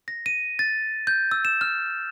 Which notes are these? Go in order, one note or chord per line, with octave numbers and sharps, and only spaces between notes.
A#6
D#7
A6
G6
E6
E7
F6